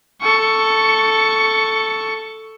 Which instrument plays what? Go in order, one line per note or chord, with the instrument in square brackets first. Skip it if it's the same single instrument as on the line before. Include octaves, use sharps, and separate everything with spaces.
[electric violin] A4 C#6